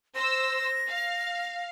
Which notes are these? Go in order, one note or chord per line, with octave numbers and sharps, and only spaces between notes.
C5 E6 A#6
F5